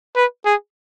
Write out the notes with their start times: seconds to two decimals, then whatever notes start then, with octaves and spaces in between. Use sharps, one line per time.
0.17 B4
0.46 G#4